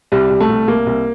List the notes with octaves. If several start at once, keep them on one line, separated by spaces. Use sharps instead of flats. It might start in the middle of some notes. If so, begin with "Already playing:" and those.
C2 G3
C2
A3
C2
C2 A#3
C2